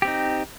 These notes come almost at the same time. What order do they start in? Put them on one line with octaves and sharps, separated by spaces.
G4 C4 D#4